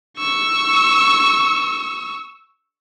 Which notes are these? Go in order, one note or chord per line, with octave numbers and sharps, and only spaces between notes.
C#6 E6